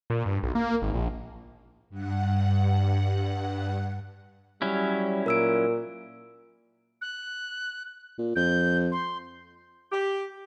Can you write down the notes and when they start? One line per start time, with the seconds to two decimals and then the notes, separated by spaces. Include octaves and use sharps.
0.10 A#2
0.26 G2
0.43 B1
0.55 A#3
0.82 G#1
0.94 A#1
1.90 G2 F#5
4.62 F#3 G3 C#4 E4
5.26 A#2 A#4 E6 D7
7.01 F#6
8.18 A#2
8.36 F2 G6
8.92 C6
9.92 G4